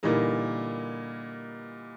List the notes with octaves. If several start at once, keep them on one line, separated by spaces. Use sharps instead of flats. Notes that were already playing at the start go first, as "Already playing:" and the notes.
A#2 D3 E3 G3 D#4 A#4